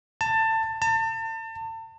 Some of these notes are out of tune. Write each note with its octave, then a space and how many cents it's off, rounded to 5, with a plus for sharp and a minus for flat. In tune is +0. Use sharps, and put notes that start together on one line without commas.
A5 +20
A5 +35